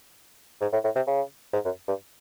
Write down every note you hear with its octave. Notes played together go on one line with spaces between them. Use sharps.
G#2
A2
A2
C3
C#3
G#2
F#2
G2